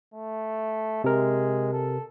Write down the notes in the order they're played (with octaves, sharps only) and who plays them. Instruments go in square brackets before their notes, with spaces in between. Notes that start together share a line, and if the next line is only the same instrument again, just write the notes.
[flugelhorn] A3
[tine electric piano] C3 A#4 [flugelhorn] G#3
[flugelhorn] A4